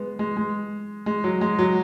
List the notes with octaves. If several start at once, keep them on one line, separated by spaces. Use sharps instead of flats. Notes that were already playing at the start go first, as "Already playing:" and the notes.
Already playing: G#3 B3
G#3
G#3
G#3
F#3
G#3
F#3